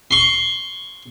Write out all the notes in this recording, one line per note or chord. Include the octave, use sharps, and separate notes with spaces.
C6 C#6